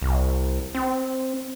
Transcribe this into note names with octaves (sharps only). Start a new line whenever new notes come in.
C2
C4